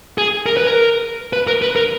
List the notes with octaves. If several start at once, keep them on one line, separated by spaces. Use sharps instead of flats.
G#4
A#4
B4
A#4
B4
A#4
B4
A#4